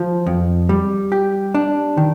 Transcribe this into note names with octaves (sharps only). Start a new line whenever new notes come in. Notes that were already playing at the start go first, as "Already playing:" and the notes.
Already playing: F3
F2
G3
G4
D4
D#3